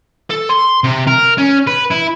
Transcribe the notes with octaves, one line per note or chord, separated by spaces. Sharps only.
A4
C6
C3
A#4
C#4
B4
E4